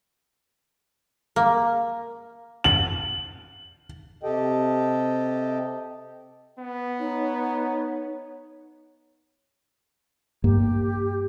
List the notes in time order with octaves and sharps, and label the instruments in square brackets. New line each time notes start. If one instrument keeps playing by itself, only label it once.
[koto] A#3
[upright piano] F#7
[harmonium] C3 G4 A4 D#5 G5
[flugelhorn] B3
[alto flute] D#4 [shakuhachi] C#5
[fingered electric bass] G2 A#3 [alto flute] G4